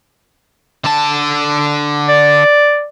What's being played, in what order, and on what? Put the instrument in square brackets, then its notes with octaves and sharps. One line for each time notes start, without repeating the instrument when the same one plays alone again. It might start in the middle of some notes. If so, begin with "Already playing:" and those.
[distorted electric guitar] D3 A5
[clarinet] D5